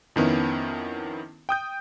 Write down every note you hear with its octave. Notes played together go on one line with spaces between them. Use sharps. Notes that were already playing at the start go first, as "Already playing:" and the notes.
F2 D#3 B3 C#4 E4
G5 D#6 G6